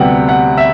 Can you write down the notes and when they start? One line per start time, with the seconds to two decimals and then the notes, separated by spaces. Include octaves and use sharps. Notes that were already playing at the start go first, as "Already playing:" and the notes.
Already playing: D2 C3 G3 B3 F#5 G5
0.29 F#5
0.57 E5